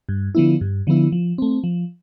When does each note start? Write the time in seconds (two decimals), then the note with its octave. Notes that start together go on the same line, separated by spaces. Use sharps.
0.09 G2
0.35 D3 F3 B3 E4
0.61 G2
0.87 D3 F3 B3 E4
1.12 F3
1.38 A3 C4
1.64 F3